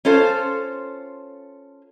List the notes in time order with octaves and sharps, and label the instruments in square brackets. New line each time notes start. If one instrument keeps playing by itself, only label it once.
[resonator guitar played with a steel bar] C#4 F4 A4 C5